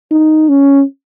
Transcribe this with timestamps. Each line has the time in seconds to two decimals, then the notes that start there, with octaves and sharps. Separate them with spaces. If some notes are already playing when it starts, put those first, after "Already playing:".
0.11 D#4
0.49 C#4